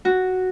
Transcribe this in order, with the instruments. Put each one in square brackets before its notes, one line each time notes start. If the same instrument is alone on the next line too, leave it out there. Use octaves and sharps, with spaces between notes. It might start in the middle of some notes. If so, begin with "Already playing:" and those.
[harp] F#4